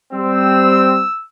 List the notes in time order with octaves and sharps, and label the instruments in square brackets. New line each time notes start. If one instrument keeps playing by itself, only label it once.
[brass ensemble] G3 C4 [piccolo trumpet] E6